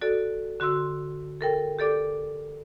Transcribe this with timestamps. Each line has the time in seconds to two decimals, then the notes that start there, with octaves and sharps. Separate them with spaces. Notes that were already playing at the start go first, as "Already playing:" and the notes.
0.01 F#4 A4 D5
0.60 D3 F#4 C6 E6
1.41 A4 A#4 G5
1.79 G4 A4 D5 D6